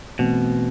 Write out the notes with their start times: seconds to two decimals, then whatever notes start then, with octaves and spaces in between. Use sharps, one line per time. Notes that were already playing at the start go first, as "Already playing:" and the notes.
0.19 B2 E3 A3 C4